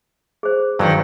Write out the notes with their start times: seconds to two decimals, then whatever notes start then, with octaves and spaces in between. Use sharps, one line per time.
0.43 G#4 C5
0.79 E2 G2 D#3 F#3